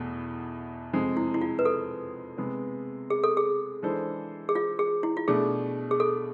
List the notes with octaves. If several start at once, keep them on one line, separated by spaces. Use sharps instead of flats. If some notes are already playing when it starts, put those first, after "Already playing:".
Already playing: E2 B2 A3
F2 C3 G#3 C4 G#4
E4
E4
F4
B4
A4
C3 G#3 B3
G#4
A4
G#4
E3 G#3 D4 A4 C5
G#4
F4
G#4
E4
F4
B2 A3 D4 G#4
G#4
A4